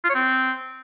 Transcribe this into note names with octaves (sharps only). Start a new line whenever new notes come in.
F4
C#5
C4